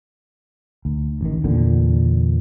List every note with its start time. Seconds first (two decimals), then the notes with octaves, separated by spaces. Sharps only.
0.85 D2
1.21 A1 D#3
1.44 E2 A#2 D3